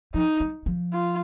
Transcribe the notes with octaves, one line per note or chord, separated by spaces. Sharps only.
F3 D#4
G3
F3
F4